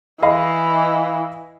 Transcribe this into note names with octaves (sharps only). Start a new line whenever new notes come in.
E3 D#5 F5 B5